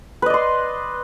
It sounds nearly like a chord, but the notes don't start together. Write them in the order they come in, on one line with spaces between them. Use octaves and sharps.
B4 D#5 D5 C6